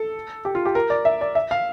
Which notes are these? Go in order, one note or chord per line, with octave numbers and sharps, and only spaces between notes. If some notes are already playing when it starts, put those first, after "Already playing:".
Already playing: A4
G4
F4
G4
A#4
D5
E5
D5
E5
F5